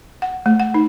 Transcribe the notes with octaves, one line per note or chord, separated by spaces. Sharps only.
F#5
A3
F#5
D#4